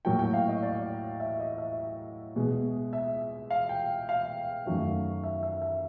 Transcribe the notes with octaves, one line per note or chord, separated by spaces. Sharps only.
A2 F#3 A#3 G5
G5
F5
D#5
D5
E5
D#5
E5
B2 G#3
E5
F5
G5
F5
F#2 D#3 F#3 A3
E5
E5
E5